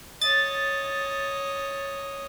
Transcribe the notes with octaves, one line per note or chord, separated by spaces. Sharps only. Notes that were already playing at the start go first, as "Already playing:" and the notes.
C#5 D#5 A6